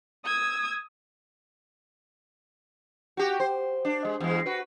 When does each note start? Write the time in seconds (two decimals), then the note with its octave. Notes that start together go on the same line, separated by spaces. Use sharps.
0.25 D#6 E6 G#6
3.17 F#4 G4
3.40 C5
3.85 D4
4.05 G#3
4.20 E2 G#3
4.46 F#4 B4